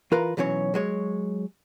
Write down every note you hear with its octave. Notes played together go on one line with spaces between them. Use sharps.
E3 F4 A#4 B4 A#5
B1 E3 F#3 C#4 C#5
F#3 G#3 C#5